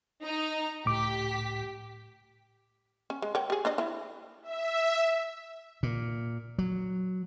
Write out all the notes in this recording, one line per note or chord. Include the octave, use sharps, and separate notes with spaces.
D#4 A#5
C#2 A2 G4 D6 B6
C#4
G#3
A#4 C#5 G5
G4 G#4
D4 C5 D#5
C4 E4
E5
A#2
F#3